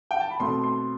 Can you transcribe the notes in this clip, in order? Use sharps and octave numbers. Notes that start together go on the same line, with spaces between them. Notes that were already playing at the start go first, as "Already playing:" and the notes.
G5
A5
B5
B2 A3 C4 C6
C6